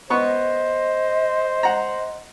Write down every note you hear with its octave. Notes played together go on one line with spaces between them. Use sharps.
B3 C5 D#5 C#6
F#5 A#5